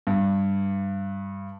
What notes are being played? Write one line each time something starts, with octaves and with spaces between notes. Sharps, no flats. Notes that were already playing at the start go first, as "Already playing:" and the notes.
G2